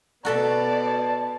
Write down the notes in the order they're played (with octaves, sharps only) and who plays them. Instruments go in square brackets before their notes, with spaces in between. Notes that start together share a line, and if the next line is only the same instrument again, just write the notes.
[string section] B2 B3 [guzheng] F#4 A4 E5 [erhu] D5 [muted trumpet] A5